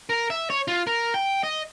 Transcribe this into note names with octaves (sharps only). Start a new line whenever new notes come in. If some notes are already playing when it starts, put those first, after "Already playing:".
A#4
E5
C#5
F4
A#4
G5
D#5